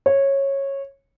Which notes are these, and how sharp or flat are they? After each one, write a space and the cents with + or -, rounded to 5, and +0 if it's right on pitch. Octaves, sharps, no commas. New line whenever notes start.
C#5 -15